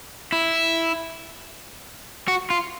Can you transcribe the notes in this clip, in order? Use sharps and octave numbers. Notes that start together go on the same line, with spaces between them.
E4
F#4
F4